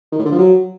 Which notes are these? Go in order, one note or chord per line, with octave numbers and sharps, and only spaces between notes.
D#3
A2
D3
F3
F#3